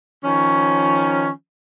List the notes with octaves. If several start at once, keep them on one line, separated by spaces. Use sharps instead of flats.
D#3 F3 C#4